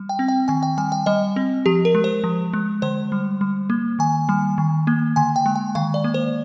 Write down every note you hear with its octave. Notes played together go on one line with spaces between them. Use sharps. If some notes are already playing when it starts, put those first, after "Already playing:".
Already playing: G3
G5
C4
G5
D#3 G#5
G5
G3 G#5
G5
G3 D#5
C4
F3 G4
A#4
G#3
C5
F3
G#3
D3 C5
G3
G3
A#3
D#3 G#5
G3
D#3
A#3
D3 G#5
G5
G#3
G5
D#3 F5
D5
A#3
C5